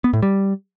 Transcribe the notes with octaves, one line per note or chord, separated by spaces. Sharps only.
B3
A2
G3